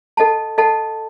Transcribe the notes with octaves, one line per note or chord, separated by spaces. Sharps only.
A4 D#5 F#5 A5
A4 D#5 F#5 A5